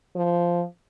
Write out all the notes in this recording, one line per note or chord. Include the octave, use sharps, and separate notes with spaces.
F3